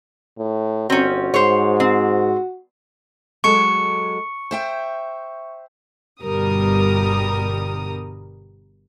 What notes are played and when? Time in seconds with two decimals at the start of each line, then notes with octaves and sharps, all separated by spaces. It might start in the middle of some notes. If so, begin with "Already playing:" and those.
0.38 A2
0.90 G1 C4 C#4 F#4
1.34 G#2 C5 C#5
1.80 C4
3.44 F#3 G#3 A4 C#6 C#7
4.51 C5 E5 G5
6.23 G1 G2 B2 G3 A#4 D#6